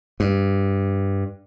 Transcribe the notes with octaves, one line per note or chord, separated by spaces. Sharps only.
G2